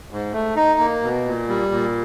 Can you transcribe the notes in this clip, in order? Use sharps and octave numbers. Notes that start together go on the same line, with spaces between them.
G#2
A3
D#4
A#3
B2
A#2
G3
A#2